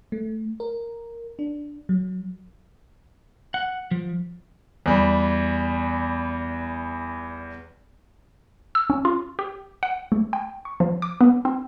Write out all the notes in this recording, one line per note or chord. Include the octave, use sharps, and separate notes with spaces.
A3
A#4
D4
F#3
F#5
F3
E2 G3
E6
C#4
F4
G4
F#5
A3
G5
C#6
F3
D6
B3
C4